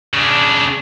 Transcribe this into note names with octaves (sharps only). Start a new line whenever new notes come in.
C#3 D4